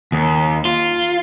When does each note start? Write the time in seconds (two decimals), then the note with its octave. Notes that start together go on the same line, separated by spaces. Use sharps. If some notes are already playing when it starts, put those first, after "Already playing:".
0.12 D#2
0.65 F4